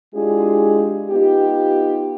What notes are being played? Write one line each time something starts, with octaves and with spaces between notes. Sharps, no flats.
G#3 D4 E4 F4 G4 G#4
B3 D#4 F4 G4